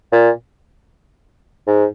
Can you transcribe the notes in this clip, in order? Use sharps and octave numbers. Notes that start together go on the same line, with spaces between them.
A#2
G#2